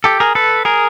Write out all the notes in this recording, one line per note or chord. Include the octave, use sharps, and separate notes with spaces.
G4 A4
G#4 A#4
A4 B4
G#4 A#4